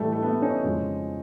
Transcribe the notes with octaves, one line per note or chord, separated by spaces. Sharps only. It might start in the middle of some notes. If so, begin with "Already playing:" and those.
Already playing: A2 E3 G3 A3
A3
A3 B3
C#4 D#4
F2 C#3 F3 G#3